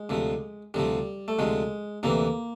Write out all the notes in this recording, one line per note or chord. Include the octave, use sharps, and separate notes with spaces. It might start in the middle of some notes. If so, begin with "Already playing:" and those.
Already playing: G#3
D2 C3 F3
D2 C3 F3 G3
A3
D2 C3 F3 G#3
D2 C3 E3 A#3